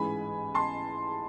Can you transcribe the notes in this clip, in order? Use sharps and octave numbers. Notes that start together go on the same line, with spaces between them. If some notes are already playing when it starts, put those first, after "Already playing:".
Already playing: A1 G#2 E3 G#3 G#5 B5
A5 C6